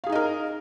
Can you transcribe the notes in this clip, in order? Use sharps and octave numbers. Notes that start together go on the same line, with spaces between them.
D#4 G#4 A#4 D#5 F5